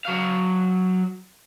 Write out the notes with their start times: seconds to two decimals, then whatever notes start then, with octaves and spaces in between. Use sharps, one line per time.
0.05 F#3 F5